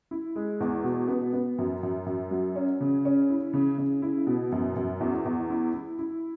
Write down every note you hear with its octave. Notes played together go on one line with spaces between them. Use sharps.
E4
G#3
E2
B2
B3
B3
F#2
F#2
F#2
F#3
C#4
C#3
C#4
E4
C#3
C#3
E4
B2
F#2
F#2
E2
E2
E4
E4
E4